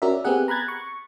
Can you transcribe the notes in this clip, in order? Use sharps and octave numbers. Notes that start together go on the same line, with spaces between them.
C#4 F#4 A#4 D5 E5
B3 C4 G4 G#4 F#5
A#5 B5 F#6 G#6 A6
C#6